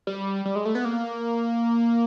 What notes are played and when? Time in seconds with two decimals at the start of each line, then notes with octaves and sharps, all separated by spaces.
0.07 G3
0.45 G3
0.56 G#3
0.65 A3
0.75 B3
0.85 A#3